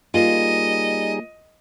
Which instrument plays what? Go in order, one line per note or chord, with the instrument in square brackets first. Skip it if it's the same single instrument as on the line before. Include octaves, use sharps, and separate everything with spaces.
[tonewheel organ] G3 D#4 G#4 [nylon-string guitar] A#3 F4 [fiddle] D#5